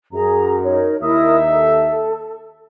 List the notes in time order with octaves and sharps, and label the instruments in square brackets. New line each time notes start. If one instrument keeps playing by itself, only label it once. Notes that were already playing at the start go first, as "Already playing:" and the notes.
[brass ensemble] F#2 [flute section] G#4 A#5
[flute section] D#4 A#4 C#5
[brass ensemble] D#2 D#4 E5 [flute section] E4 A#4 D#6
[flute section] A4